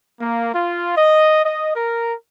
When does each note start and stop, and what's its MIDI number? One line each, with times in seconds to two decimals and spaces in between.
0.20 0.54 58
0.54 0.93 65
0.97 1.43 75
1.44 1.75 75
1.75 2.13 70